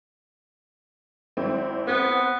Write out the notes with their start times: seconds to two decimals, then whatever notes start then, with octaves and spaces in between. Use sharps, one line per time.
1.37 G#1 C4 E4
1.87 B3 C4